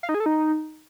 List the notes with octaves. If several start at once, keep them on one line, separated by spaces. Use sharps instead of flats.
F5
D#4
G#4
A4
D#4